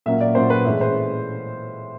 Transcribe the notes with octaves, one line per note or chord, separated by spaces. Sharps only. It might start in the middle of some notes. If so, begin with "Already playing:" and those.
A#2 F#3 A#3 C#4 E5
D5
A#2 F#3 A#3 C#4 C5
B4
A2 E3 G#3 C#4 E5
C5